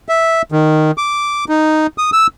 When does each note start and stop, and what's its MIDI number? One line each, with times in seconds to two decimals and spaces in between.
0.09 0.42 76
0.52 0.91 51
0.98 1.45 86
1.49 1.87 63
1.98 2.10 87
2.13 2.27 88